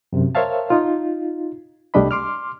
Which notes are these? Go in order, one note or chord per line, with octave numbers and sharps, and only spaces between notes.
F#2 C3
A#4 C5 C#5 E5 F5 A5
D#4 F4
C2 G3 A3 D4 D#5 B5
C6 D6 F6